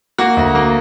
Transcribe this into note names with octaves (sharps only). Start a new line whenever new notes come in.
A#3 F#4
D2
A#3